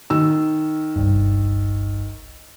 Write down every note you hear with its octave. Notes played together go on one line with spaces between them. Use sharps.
D#3 E6
G1 C2 G2